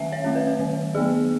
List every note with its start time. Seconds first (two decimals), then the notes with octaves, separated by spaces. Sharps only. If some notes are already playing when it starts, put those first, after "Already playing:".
Already playing: D#3 A3 C#4 E5 F#5 G#5
0.12 C#5
0.24 A3 C#4
0.35 B4
0.59 D#3
0.95 F#3 B3 G#4